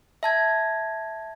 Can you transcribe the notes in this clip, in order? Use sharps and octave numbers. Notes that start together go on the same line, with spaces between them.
E5 A5 G#6